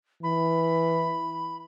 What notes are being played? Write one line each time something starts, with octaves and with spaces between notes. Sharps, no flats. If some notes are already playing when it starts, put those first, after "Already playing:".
E3 B5